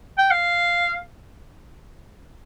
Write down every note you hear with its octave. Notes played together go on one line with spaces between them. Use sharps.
G5
F5